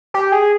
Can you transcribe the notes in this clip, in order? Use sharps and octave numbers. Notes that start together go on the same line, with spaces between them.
G4
G#4